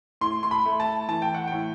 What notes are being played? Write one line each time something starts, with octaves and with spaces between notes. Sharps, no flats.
A2 C6
C6
B5
A3
A5
E3 A5
G5
F#5
A2 G5